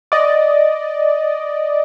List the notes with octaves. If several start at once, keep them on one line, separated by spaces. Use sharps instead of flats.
D5 D#5